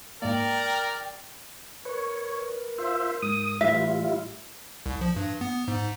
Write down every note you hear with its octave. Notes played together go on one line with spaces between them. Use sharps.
G#2 G#3 A#3 A#4 D5 G5
A#4 B4 C#5
F4 C5 E5
G#2 D#6
A2 E3 G3 E4 F4 E5
C2
F3
G2
B3
G#2